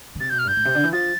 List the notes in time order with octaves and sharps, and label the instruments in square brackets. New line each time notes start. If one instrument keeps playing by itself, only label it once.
[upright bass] D3
[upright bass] C3 [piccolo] A6
[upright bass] B2 [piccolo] G6
[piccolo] F6
[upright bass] G2 [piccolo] G6
[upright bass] A2
C3
D3
E3
[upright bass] F3 [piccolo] A6